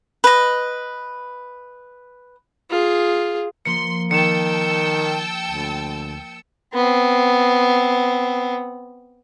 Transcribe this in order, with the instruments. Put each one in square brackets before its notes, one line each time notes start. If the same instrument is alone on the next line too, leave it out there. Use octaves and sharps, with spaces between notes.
[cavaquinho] B4 D#5
[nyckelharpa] F4 G#4
[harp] F3 A#3 [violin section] C6 [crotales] C#7
[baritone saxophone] D#3 [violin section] G5 A5 E6 [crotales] C#7 E7
[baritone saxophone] D2
[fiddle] B3 C4